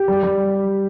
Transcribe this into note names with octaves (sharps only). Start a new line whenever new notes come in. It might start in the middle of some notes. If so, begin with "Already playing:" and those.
Already playing: G4
G3
G3